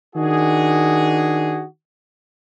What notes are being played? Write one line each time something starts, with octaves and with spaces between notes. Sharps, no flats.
D#3 D4 F#4 G#4